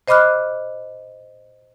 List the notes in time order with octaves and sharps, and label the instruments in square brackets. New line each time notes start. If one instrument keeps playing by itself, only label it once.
[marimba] C5 D#5 B5 D6 F6 F#6